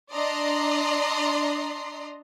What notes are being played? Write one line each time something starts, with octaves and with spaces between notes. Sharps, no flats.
D4 D5 D#5 A#5 C6 C7